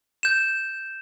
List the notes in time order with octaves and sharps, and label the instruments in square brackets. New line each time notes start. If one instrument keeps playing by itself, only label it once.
[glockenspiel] G6 E7